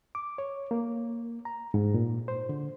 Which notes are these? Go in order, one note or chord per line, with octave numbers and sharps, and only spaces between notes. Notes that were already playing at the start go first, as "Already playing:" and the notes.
D6
C#5
A#3
A#5
G#2
A#2
C5
D3